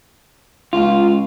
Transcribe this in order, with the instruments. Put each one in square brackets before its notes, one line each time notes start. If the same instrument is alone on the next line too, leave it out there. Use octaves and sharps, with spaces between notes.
[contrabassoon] C#2 [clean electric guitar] F4